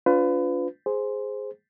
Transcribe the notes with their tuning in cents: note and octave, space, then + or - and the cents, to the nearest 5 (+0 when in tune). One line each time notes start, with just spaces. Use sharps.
D4 -40 F4 +15 B4 +30
G#4 +0 C5 +0